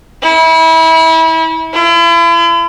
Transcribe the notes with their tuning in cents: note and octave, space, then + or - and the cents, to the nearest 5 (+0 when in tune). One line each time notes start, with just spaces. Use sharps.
E4 -30
E4 +40